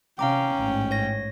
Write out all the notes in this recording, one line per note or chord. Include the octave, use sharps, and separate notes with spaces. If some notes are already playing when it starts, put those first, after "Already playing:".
C3 C#4 F5 G5 A#5 D6
A1 G#2
C#5 A#6